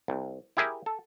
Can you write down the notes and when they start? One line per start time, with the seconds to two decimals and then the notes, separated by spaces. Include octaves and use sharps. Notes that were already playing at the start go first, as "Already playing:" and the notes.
0.08 C2
0.57 E4 G4 G#4 A#4 E5
0.86 A4